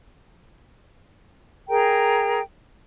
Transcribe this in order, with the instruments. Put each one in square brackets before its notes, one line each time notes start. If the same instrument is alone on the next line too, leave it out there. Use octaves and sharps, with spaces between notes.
[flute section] G#4 A#4 G5 A#5